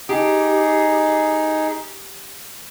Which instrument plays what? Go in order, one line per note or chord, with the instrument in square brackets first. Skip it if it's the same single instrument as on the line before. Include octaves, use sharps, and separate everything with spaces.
[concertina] D#4 G#4 [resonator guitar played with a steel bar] G4